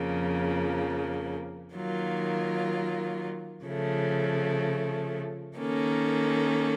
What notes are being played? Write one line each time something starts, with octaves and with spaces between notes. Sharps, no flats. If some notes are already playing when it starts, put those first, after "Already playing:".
Already playing: F2 C#3 F3 A#3
D#3 F#3 A#3 F4
C#3 F3 A3
D#3 A#3 C#4 A4